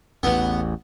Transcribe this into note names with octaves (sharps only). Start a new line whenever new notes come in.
A1 E2 B3